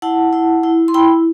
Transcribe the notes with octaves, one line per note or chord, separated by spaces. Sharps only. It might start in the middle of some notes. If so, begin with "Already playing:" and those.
E4 F#5 A5
E4
E4
C6
E4 G5 B5